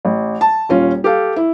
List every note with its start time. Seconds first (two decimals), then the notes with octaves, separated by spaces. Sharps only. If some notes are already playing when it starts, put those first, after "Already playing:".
0.05 A1
0.41 A5
0.69 D#1 C#4 F4
1.04 G4 A4 F5
1.36 E4